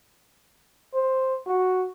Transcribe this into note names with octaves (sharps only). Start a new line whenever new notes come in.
C5
F#4